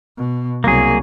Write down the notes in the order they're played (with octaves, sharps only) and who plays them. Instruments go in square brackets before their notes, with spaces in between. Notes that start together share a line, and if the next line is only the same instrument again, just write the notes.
[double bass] B2
[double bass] C2 F#3 [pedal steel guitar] A#3 G#4